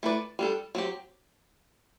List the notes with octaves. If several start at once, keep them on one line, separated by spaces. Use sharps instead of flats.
A3 E4 B4 D5
G3 D4 A4
F#3 C4 G4